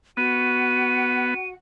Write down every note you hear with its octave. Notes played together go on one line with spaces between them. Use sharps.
B3 F#4 F#5 D#7